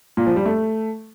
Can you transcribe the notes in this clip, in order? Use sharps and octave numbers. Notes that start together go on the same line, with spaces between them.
A#2
F3
G3
A3